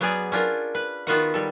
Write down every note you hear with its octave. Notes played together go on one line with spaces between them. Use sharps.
F#3 B3 C#4 G#4 D5
C#4 D4 F4 A#4
B4
D#3 B3 F4 F#4 B4 F#5
G3 A4